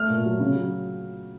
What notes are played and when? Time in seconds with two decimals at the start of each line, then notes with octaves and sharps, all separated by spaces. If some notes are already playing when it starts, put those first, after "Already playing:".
Already playing: A3 F6
0.10 A#2
0.25 F#3
0.40 C#3
0.55 F#3